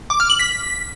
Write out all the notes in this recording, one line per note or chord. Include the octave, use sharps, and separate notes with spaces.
D6
F6
F#7
B6